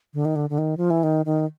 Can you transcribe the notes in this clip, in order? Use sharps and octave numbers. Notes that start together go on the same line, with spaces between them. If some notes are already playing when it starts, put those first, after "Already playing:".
D3
D#3
D3
D3
D#3
F3
E3
D#3
D#3